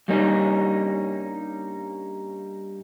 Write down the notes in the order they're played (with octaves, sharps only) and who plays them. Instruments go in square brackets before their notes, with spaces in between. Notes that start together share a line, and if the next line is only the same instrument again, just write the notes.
[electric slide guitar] G2 G3 A#3 C#4 D#4